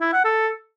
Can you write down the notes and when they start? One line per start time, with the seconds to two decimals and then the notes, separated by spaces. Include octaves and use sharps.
0.01 E4
0.13 F#5
0.25 A4